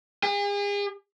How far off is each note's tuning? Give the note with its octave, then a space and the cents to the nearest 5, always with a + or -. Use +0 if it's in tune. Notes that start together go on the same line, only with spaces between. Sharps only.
G#4 -40